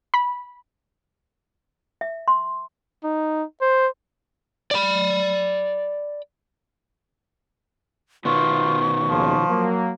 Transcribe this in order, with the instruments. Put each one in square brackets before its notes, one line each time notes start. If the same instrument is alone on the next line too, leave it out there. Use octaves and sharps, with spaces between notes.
[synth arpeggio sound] B5
[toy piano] E5
C6
[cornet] D#4
C5
[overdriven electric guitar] D5 B5
[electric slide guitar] B2 D#3 B3 [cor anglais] F4 [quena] C#6
[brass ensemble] D#2 C#3 [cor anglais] F3
[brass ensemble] F#3 A#3